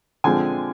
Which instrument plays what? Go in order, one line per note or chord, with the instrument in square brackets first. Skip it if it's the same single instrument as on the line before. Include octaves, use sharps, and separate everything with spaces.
[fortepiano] D3 F3 G#3 C4 G#5